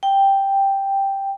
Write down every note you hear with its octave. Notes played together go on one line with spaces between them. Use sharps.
G5